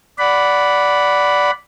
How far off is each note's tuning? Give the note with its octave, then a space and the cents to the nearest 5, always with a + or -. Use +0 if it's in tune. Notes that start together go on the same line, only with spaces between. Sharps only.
D5 -10 F#5 +0 B5 +0